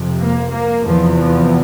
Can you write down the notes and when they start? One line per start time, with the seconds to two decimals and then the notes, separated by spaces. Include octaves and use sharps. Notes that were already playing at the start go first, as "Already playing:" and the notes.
Already playing: F2 C3
0.19 A#3
0.52 A#3
0.85 E2 C3 F3
1.18 F3